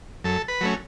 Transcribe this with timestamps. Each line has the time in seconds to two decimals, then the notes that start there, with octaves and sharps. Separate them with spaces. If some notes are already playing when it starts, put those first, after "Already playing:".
0.24 F#2 A4
0.48 B4
0.61 F#3 A3 C#4